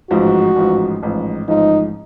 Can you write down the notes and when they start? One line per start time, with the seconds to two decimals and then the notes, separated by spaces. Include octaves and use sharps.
0.11 A1 G#2 F3 F#4
0.56 A1 G#2 F3
1.03 A1 G#2 F3
1.48 A1 G#2 F3 D#4